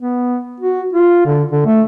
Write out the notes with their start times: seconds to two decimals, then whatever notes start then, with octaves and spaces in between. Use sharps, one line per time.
0.01 B3
0.60 F#4
0.93 F4
1.25 D3
1.51 D3
1.66 A3